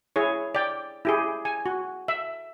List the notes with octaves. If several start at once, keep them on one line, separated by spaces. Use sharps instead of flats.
E4 G#4 C#5
D5 G5
E4 G4 G#4
G#5
F#4
E5